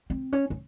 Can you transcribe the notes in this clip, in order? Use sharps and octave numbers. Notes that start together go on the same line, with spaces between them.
C4
C#4
C#4